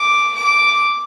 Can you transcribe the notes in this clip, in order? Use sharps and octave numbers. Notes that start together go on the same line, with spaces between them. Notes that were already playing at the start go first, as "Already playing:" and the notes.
Already playing: D6
D6